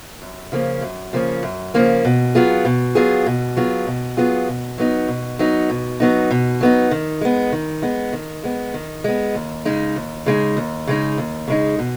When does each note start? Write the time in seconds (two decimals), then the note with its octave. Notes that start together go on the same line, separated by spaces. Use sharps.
0.22 F#2
0.52 C#3 F3 A#3 C#4
0.82 F#2
1.13 C#3 F3 A#3 C#4
1.43 F#2
1.74 C#3 F3 A#3 C#4
2.05 B2
2.35 F#3 B3 F4 G#4
2.65 B2
2.95 F#3 B3 F4 G#4
3.26 B2
3.57 F#3 B3 F4 G#4
3.87 B2
4.17 F#3 B3 F4 G#4
4.48 B2
4.78 F#3 B3 D#4
5.08 B2
5.39 F#3 B3 D#4
5.70 B2
6.00 F#3 B3 D#4
6.31 B2
6.61 F#3 B3 D#4
6.91 D#3
7.21 G#3 B3
7.52 D#3
7.82 G#3 B3
8.13 D#3
8.44 G#3 B3
8.74 D#3
9.04 G#3 B3
9.35 D#2
9.65 C#3 G#3 D#4
9.96 D#2
10.26 C#3 G#3 D#4
10.57 D#2
10.87 C#3 G#3 D#4
11.18 D#2
11.48 C#3 G#3 D#4
11.79 B2